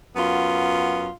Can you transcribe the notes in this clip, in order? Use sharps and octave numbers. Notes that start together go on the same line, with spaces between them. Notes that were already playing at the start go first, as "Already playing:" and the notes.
F#2 B3 F4